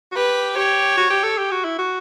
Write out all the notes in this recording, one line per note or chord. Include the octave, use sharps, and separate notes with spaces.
F#4
G4 B4
G4 C#5
F#4
G4
A4
G4
F#4
E4
F#4